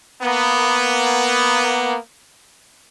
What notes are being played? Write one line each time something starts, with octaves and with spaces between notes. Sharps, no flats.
A#3 B3